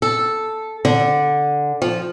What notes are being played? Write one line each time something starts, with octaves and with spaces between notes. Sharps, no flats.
A4
D3
F3